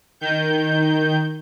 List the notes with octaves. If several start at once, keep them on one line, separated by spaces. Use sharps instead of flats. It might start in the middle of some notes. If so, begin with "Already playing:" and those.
D#3 G6